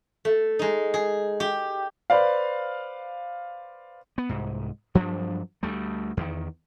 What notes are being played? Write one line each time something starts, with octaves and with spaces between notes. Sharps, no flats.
A3
G#3 D#4
G#4
G4
B4 C5 D5 F5
B3
C2 G#2
G2 F3 F#3 D4
D2 G3 A3
E2 D#3